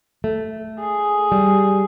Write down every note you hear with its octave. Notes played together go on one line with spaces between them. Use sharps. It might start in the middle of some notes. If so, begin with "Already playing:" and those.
A3
G#4
G3